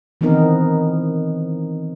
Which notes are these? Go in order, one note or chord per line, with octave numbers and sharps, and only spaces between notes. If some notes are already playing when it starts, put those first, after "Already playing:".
D#3 E3 B3 C4 D#4 A#4